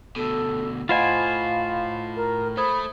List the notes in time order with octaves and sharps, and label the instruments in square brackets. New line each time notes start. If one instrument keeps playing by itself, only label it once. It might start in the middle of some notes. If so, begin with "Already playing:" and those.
[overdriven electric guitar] D2 B2 [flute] A4
[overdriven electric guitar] A2 [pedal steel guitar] F4 C5 G#5 [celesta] D#5 F#5 B5 [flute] F5
[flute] A#4
[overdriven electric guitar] A3 [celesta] C5 D#6 G#6 [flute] B5